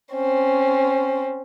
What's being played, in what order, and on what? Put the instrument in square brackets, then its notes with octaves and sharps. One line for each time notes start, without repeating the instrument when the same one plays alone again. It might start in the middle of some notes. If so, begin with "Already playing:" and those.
[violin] C4 C#4